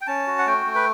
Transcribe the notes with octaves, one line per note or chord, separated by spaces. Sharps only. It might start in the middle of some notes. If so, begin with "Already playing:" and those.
G5
C#4 A5
F#4
F#5
A3 G5
A3
B4